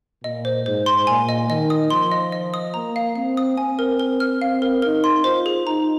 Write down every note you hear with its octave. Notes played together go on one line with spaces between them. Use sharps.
A#2 D#5
C5
G#2 C5
C6
A#2 G#5
D#5
D#3 D#5
D#6
F3 C6
D#5
D#5
D#6
A#3 A#5
F5
C4 F5
D#6
C4 G#5
A#4
A#4
F6
C4 F5
A#4
D#4 A#4
C6
F4 C5
G#4
D#4 A#5